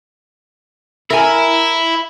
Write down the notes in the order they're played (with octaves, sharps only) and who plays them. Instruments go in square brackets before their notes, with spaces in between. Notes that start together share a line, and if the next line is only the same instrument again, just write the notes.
[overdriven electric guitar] E4 E5 [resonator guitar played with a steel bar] A#4 G#5